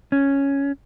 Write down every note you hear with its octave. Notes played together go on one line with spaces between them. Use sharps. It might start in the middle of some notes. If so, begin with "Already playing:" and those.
C#4